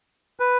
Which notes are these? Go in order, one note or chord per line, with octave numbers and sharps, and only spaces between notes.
B4